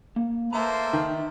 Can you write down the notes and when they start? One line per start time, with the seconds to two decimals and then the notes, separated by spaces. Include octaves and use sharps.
0.16 A#3
0.53 A#3 A4 B4 C5 E5 A#5
0.93 D#3